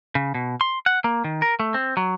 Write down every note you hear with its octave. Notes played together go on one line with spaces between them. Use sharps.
C#3
B2
C6
F#5
A#3
D#3
A#4
A3
C4
F#3